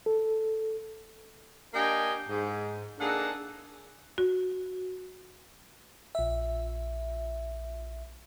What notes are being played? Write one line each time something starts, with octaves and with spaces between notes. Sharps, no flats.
A4
A#3 D4 G4 D#5 G5 G#5
G#2
A#3 D4 D#4 G#4 A4 F#5
F#4
A#1 E5